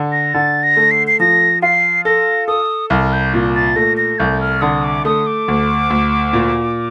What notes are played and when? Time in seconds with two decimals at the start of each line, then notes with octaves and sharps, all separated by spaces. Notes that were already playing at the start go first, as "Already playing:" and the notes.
Already playing: D3
0.12 A#6
0.34 D3 A6
0.63 A#6
0.77 A3
0.91 C7
1.07 C7
1.20 F3 A#6
1.62 F4 C7
2.05 A4 A#6
2.47 A4 D#6
2.90 C2 F6
3.13 G6
3.34 A#2
3.55 A6
3.76 A3 A#6
3.97 A#6
4.19 C2 G6
4.41 F6
4.61 D3 D#6
4.84 D6
5.05 A3 D#6
5.27 D6
5.48 D2
5.90 D2
6.33 A#2